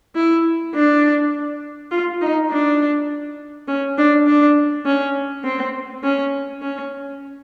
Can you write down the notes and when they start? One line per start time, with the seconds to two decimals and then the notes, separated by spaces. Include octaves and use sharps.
0.16 E4
0.74 D4
1.91 F4
2.21 D#4
2.51 D4
3.68 C#4
3.98 D4
4.27 D4
4.86 C#4
5.44 C4
6.03 C#4
6.62 C#4